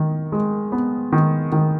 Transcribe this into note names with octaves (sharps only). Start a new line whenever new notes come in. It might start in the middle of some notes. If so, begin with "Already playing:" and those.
Already playing: D#3
G#3
B3
D#3
D#3